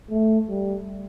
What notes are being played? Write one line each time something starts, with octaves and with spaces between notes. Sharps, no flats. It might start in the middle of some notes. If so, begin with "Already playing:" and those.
A3
G3